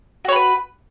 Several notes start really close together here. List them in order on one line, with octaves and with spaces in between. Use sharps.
F#4 C#5 B5 B4